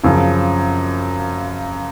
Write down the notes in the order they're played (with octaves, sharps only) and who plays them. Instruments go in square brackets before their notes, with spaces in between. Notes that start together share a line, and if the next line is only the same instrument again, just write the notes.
[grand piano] F#2 C#3 F3